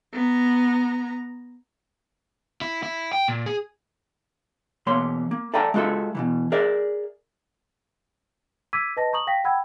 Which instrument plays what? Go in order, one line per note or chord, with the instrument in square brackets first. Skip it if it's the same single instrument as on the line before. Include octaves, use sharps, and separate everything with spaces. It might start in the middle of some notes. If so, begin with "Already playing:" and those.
[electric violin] B3 A#5
[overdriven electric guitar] E4
E4
G5
A#2
G#4
[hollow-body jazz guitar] E2 B2 A#3 C#5 C6
A#3
A4 D5 E5 G5 G#5 A#5
G#3 F4 F#4 A4 E5
B2 D#3 E3
G#4 A#4 D5 E5
[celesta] D6 E6 G#6 B6 D#7
B4 D#5 A5 A#6
A#5 C#6 D#6 F#7
F5 G5 A#6 B6
F#5 G5 B5 E6 G#6